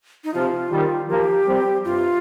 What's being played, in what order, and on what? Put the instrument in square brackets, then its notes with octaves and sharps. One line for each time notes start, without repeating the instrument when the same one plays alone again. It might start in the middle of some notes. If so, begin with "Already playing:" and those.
[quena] D#4
[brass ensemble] C3 F3 [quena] F4
[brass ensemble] D#3 G3
[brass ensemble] F3 A#3 [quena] G4
[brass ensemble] G3 C4
[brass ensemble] G2 C3 [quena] F4